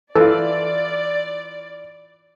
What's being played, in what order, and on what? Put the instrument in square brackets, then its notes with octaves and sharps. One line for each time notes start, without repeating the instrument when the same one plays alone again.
[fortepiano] E3 F4 [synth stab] A4 [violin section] D5